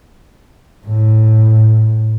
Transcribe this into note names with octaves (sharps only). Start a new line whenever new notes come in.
A2